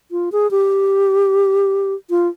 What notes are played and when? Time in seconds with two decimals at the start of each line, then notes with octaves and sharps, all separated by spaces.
0.11 F4
0.32 G#4
0.51 G4
2.10 F4